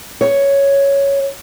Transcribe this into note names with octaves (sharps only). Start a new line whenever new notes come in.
C#5